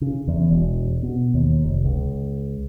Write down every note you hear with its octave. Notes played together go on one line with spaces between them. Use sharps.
C#3
E2
E1
B2
D#2
F1
C#2